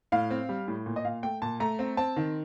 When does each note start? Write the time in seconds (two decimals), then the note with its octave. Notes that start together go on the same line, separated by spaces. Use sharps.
0.12 A2 F5
0.30 C4
0.49 G3
0.68 A2
0.86 A#2
0.96 D#5
1.05 A#2 F5
1.23 A3 G5
1.42 A#2 A5
1.60 A3 A#5
1.79 C4
1.97 C4 A5
2.16 D#3